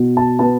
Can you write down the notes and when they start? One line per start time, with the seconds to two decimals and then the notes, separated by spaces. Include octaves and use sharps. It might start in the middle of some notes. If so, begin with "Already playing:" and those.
Already playing: B2
0.17 A5
0.39 B3 A5